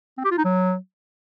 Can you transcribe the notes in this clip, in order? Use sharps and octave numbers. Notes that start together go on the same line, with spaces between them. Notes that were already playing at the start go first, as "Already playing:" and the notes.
C4
G4
F4
D#4
F#3